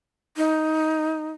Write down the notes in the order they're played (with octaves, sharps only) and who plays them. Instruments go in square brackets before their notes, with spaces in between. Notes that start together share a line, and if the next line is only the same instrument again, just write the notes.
[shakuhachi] D#4